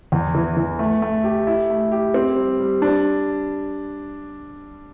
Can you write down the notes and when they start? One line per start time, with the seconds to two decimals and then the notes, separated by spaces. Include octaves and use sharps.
0.12 E2
0.35 E3
0.57 E3
0.79 A3
1.02 A3
1.24 G4
1.47 E4
1.70 A3
1.92 G4
2.14 C4
2.36 G3
2.60 G3
2.82 D4